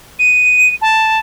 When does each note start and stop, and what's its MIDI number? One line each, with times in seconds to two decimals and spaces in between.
0.19 0.73 99
0.81 1.19 81